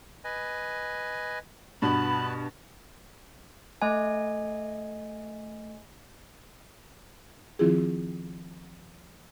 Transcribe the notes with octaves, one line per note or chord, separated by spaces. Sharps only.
B4 D#5 G#5
G2 B2 B3 B4 A5 B5
A3 D#5 G#5
D#3 F3 C4 E4 F4 G#4